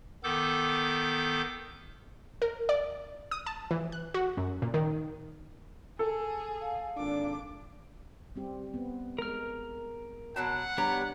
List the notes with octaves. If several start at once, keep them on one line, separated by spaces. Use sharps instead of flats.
D#3 B3 A4 D6 G6
A#4
D5
D#6
A5
E3
F#6
F#4
F#2
A#2
D#3
G#4 A4
F5
G#1 A#2 D4 D6
G3 C4 G4
B3 C4
G#3 A#4 F6
B2 F#3 F#5 A5
G3 B3 D4 G4 C#5 A#5